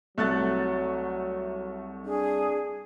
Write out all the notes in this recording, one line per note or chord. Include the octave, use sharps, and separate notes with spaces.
C2 F#3 A3 F#6 A6
D4 G#4